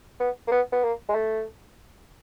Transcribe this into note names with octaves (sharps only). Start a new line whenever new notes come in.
B3
A#3
B3
B3
A#3
G#3
A3